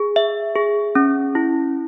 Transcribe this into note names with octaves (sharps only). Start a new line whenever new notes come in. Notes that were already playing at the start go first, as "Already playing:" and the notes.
Already playing: G#4
E5
G#4
C#4
E4